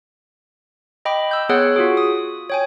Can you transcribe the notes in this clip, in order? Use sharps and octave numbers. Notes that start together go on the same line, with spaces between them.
D#5 G5 B5 D6
E6 G6
B3 G#4 C#5 F#5 E6 F#6
F4 F#4 G#4
D#6
C#5 G5 G#5